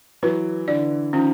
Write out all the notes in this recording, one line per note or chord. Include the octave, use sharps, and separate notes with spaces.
E3 F#3 B4
D3 E3 D5
D#3 F3 C#4